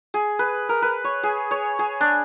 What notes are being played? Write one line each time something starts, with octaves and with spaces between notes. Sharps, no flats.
G#4
B4
A#4
B4
C#5
G#4
C#5
G#4
D4